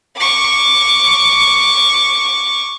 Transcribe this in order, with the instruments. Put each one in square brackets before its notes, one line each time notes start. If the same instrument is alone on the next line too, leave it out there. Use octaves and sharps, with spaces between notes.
[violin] C#6 D6